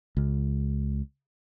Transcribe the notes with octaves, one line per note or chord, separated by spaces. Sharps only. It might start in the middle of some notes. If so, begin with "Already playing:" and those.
C#2